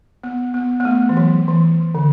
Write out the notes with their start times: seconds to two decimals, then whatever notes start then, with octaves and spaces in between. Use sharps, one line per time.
0.23 B3
0.54 B3
0.80 B3
0.85 A3
1.09 E3
1.17 F#3
1.48 E3
1.95 D3